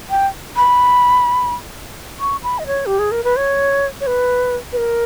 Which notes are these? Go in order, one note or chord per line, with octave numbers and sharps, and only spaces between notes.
G5
B5
C#6
B5
D#5
C#5
G4
G#4
A#4
B4
C#5
C#5
B4
B4
A#4